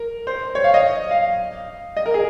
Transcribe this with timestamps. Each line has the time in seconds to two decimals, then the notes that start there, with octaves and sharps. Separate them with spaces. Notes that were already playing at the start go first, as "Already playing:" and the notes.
Already playing: A#4
0.27 C5
0.55 C#5
0.64 F5
0.74 D#5
1.11 F5
1.97 D#5
2.06 A#4
2.14 G#4